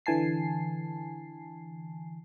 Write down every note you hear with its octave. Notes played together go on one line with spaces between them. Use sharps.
D3 E3 G#5 A5 C7